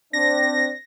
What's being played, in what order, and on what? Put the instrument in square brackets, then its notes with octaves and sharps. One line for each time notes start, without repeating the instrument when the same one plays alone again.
[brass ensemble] C4 D4 [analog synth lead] A#6